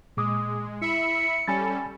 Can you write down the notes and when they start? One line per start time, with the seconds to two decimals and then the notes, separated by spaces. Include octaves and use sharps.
0.17 A#2 G#3 D6 D#6
0.82 E4 E5 B5 C#7
1.47 G3 C#4 A4 G#5 B5 A6